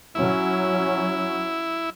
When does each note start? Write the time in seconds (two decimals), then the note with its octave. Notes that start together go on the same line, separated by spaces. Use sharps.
0.15 F#3 C#4 E4